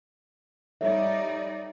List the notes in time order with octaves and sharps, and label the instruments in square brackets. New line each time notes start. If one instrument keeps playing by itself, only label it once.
[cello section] G3 D#4 D5 [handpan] A4 C#5 E5